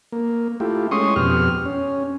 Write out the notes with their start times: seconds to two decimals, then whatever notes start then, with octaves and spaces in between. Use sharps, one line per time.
0.12 A#3
0.60 A3 E4 F4 G4
0.91 G#3 C#4 C6 C#6 D#6
1.16 F2 B2 G4 F6
1.66 C#4